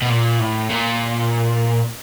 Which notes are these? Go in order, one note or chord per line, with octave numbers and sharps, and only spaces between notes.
B2
A#2
A2
A#2